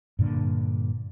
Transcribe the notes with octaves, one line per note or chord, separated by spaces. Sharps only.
G2 A#2 D3